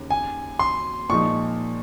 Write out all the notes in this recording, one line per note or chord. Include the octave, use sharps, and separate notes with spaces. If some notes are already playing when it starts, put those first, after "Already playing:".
Already playing: D#2 C#3
G#5
C6
A#2 F3 G#3 D#4 C#6